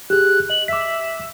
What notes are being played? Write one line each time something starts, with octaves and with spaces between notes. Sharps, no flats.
G4 G#4 F#6
D#5 F#7
E5 D6 B6